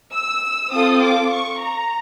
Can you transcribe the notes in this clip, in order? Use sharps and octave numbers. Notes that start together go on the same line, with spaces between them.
E6
C4 F4 A4 D#6
D6
C#6
A#5